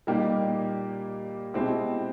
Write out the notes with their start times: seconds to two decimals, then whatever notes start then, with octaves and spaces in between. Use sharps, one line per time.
0.07 A#2 G3 A#3 D#4 G4
1.54 B2 G#3 C4 E4 G4